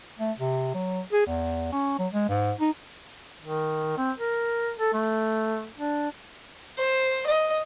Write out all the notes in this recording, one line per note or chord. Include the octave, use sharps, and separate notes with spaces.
A3
C3
F#3
G#4
E2
C#4
F#3
G#3
G#2
D#4
D#3
C4
A#4
A4
A3
D4
C5
D#5